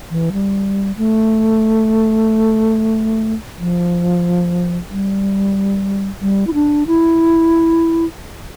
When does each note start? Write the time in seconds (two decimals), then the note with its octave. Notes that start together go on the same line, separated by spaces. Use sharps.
0.10 E3
0.33 G3
0.97 A3
3.59 F3
4.90 G3
6.22 G3
6.47 E4
6.54 D4
6.87 E4